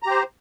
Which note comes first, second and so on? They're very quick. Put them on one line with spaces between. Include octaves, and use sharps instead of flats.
A#5 G4 C5